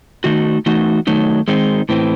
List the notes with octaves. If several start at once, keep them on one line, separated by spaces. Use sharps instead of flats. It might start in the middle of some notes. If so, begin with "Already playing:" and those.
D#3 A3 D#4 F#4
E3 A3 D#4 F#4
D#3 F#3 A3 D#4
D#3 G#3 C4 D#4
A2 E3 C4